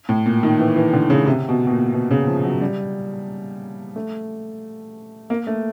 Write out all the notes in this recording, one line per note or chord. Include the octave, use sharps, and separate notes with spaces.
A2
A#2
D#3
E3
E3
D3
C#3
C3
B2
B2
A#2
B2
C#3
F3
F#3
G3
A3
A#3
A3